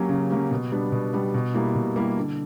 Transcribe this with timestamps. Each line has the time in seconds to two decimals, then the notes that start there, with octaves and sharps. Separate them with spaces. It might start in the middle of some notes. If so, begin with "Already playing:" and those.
Already playing: F#3 A#3 C#4 G4
0.09 C#3
0.30 F#3 A#3 C#4 G4
0.51 B2
0.72 G3 B3 D4
0.92 B2
1.13 G3 B3 D4
1.34 B2
1.54 G3 A#3 E4
1.75 B2
1.96 G3 A#3 E4
2.17 D3